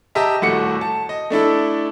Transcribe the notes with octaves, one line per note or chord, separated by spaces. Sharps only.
G4 D#5 E5 A5 A#5
D#1 A2 A3 F#4 D6 C#7
A5
D#5
A3 D4 E4 A4